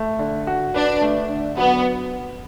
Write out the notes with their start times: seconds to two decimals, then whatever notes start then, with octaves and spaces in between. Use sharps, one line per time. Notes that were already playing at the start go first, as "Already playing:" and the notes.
Already playing: A3
0.19 D3
0.47 F#4
0.74 D4 B4
1.01 A3
1.30 D3
1.57 F#3 B3